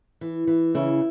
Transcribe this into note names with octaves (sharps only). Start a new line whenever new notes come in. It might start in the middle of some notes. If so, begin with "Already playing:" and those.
E3
E3
C#3 E4